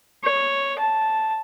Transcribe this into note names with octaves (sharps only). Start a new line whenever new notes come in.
C#5
A5